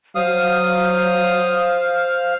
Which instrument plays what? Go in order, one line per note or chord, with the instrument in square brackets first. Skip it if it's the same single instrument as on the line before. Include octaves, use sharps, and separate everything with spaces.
[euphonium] F#3 [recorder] C5 [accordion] F5 [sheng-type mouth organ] D#6